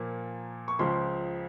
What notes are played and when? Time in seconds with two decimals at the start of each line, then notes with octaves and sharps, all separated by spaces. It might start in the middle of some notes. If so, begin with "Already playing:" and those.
Already playing: A#2 F3 A#3
0.68 C#6
0.79 C#2 C#3 F3 C6